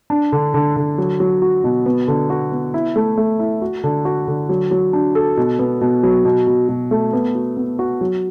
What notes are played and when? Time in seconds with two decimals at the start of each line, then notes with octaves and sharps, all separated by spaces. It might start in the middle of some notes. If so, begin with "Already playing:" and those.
0.10 D4
0.32 D3
0.54 D3
0.76 D3
0.98 F#3
1.20 F#3
1.42 F#4
1.64 B2
1.86 B3
2.08 D3
2.30 F#4
2.52 B3
2.74 E4
2.96 A3
3.18 A3
3.39 E4
3.62 F#4
3.84 D3
4.05 F#4
4.28 D3
4.49 F#3
4.71 F#3
4.93 D4
5.15 A4
5.37 B2
5.59 B3
5.81 B2
6.03 F#3
6.25 B2
6.47 B2
6.69 B2
6.91 A3
7.13 B3
7.35 F#4
7.57 B3
7.79 F#4
8.01 F#3